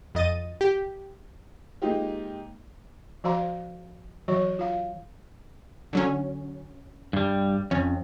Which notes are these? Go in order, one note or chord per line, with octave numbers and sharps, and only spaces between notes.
F2 D#5 A6 D#7
G4
G#3 A#3 D#4 F4 G4
F3 F#4 C5 F5 A#5 C6
E3 F#3 F#4 C#5 C#6
F4 F5
D3 F#3 C#4
G2 G3
F2 C#4